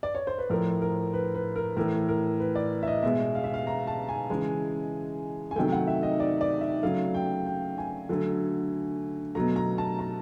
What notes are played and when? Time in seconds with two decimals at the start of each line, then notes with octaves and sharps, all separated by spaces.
0.03 D5
0.15 C#5
0.27 C5
0.38 B4
0.50 A2 F3 A3 A#4
0.82 A#4
1.13 B4
1.35 B4
1.56 A#4
1.77 A2 E3 A3 A#4
2.08 A#4
2.40 B4
2.55 D5
2.83 E5
2.88 D#5
3.02 B2 G#3 E5
3.35 F5
3.44 E5
3.54 F5
3.67 A#5
3.87 A5
4.09 G#5
4.30 C#3 E3 G#3
5.51 G#5
5.56 C3 D#3 F#3 A3 G5
5.72 F#5
5.87 E5
6.03 D#5
6.20 D5
6.41 D5
6.61 E5
6.83 C#3 F#3 A3 F5
7.14 G5
7.46 G5
7.78 G#5
8.09 D3 F#3 A3
9.35 B2 F#3 A3 A#5
9.56 A#5
9.78 A5
9.99 A#5